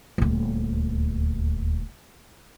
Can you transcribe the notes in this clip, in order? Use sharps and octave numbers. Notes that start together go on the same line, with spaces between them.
D#1 D2